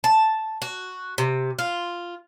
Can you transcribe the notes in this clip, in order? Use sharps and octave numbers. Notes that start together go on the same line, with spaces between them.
A5
F#4
C3
F4